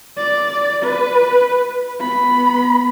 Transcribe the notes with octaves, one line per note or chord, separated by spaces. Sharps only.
D5
B4
B3 B5